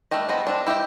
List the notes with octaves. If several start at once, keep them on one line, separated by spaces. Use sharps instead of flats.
G3 A3 D4 G4 D#5
F3 B3 D#5
F3 C4 D4
E4 G4 C#5 D#5 G5